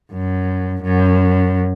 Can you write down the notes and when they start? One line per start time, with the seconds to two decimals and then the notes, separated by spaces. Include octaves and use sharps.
0.12 F#2
0.83 F#2